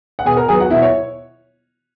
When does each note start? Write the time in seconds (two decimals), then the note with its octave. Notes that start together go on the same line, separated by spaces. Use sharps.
0.19 F#5
0.25 B2 G#4 G#5
0.37 A#4 A#5
0.48 F#3 B3 G#4 G#5
0.60 F#4 F#5
0.70 B2 E4 E5
0.82 C#5